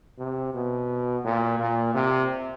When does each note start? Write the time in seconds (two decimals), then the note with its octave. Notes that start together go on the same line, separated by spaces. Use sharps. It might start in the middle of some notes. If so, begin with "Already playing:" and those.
0.18 C3
0.54 B2
1.24 A#2
1.59 A#2
1.94 C3